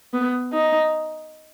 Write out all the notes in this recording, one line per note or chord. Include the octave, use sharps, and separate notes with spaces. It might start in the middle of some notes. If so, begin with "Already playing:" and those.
B3
D#4